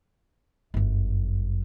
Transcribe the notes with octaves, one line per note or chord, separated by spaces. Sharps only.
G1 F#2